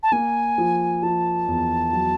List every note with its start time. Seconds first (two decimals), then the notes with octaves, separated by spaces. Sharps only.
0.03 A5
0.12 A#3 G#5
0.58 F3
1.03 F3 A5
1.48 E2
1.93 F#3